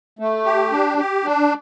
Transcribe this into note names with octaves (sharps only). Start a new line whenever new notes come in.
A3
G4
D4
G4
D4